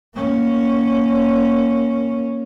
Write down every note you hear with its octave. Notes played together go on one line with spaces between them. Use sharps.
A#3 C#4